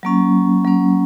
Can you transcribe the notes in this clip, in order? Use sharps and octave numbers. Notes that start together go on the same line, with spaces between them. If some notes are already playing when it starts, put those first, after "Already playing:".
F#3 A#3 C#4
F#3 A#3 C#4